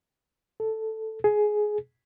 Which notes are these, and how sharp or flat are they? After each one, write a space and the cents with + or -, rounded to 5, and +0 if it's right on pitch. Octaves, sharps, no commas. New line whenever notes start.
A4 +0
G#4 +15